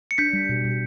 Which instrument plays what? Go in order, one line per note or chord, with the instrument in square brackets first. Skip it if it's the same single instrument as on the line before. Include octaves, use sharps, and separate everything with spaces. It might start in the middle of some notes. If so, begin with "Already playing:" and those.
[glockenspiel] C#7
[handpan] D4 [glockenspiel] G6 B6
[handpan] G3
B2
B2